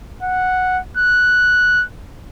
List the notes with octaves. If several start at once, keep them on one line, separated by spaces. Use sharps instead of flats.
F#5
F#6